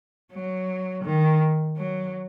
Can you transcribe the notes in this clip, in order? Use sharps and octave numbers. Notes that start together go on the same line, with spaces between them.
F#3
D#3
F#3